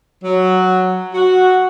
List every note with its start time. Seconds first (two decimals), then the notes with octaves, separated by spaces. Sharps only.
0.23 F#3
1.14 F#4